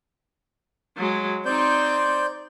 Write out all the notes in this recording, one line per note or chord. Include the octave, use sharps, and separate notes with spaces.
F#3 G#3
C4 D#4 C5 D5 G6